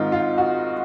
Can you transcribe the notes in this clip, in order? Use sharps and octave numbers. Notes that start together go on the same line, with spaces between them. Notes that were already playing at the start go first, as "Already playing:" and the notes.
Already playing: G#2 D#3 G#3 C4 D#4 F4
F4
F#4